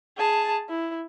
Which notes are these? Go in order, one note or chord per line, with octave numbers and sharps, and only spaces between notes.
G#4 A5
E4